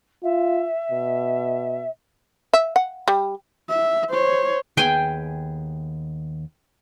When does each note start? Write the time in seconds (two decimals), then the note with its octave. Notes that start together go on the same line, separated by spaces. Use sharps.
0.23 F4 E5
0.91 B2
2.53 E5
2.76 F#5
3.08 G3
3.69 E5
4.11 C5 C#5
4.77 D#2 B3 G#4 G5 G#5